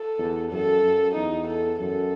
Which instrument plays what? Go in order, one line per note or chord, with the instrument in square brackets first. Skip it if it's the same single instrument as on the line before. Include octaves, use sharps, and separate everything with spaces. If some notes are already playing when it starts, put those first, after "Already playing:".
Already playing: [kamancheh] A4
[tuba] E2
[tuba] F#2 [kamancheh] A4
[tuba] F#2
[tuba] E2 [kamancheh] D#4
[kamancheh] A4
[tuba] F#2 [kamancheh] A4